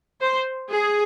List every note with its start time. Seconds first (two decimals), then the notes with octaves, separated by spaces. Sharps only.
0.21 C5
0.70 G#4